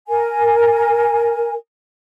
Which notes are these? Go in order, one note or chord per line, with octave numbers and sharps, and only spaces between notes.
A#4 G#5